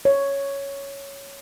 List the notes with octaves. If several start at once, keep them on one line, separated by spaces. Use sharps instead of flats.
C#5